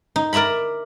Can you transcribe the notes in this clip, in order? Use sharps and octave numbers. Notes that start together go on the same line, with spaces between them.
D#4
A#4 D5 E5 A#5 B5